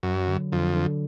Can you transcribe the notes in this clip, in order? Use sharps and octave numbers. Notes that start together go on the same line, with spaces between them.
F#2 F#3
D3
F2 D3
D3